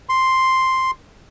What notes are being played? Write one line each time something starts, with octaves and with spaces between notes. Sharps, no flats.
C6